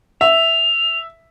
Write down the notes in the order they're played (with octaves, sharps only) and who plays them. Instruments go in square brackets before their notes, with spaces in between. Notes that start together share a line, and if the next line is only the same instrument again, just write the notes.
[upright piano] E5 [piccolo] F7